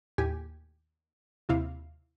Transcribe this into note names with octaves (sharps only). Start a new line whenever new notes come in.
D#2 A2 G4 G#5
D#2 C3 E4 F5